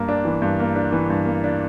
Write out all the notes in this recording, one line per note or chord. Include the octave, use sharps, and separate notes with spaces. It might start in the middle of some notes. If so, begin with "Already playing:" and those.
Already playing: G2 A#3
D4
E3
G2
A#3
D4
E3
G2
A#3
D4